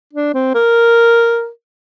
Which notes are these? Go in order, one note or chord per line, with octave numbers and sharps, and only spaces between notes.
D4
C4
A#4